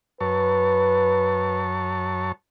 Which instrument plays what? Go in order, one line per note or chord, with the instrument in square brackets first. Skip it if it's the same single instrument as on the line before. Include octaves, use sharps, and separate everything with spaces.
[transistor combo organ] F#2 C#5 A5 [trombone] B4